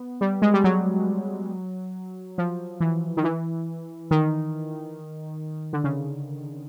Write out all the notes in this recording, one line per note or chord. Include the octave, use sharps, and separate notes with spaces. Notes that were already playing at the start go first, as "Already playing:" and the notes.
Already playing: B3
G3
G#3
G3
F#3
F3
E3
D#3
E3
D#3
D3
C#3